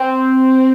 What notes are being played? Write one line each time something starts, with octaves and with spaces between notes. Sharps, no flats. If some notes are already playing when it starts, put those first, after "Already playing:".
Already playing: C4